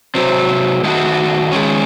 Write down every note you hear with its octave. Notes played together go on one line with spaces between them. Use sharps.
C3 F#3 C4
D#3 A3 D#4 F#4
D#3 G#3 C#4